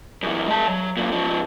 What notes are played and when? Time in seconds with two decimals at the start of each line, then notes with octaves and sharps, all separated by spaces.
0.23 F#2 E3
0.48 G#3 A5
0.68 F#3
0.97 F#2 A#2
1.12 G#2 F3